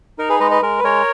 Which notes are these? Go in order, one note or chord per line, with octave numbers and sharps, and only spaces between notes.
D#4 A#4
G#4 B4
G#3 B4 D#5
B4 D#5
G#3 A#4
B4
G#3 A#4 C#5